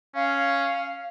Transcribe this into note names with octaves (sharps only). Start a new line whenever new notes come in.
C#4 F5